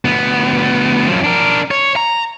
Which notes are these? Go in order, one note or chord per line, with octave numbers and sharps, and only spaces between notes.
D2 B3
F#2 F3
D4 A#4
C#5
A#5